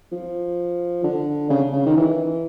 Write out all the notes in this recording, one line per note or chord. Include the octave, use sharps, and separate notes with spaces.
F3
D3
C#3
C#3
D#3
E3